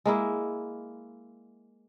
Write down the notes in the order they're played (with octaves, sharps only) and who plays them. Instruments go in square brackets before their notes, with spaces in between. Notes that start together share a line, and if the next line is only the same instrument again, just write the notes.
[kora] G#3 A#3 E4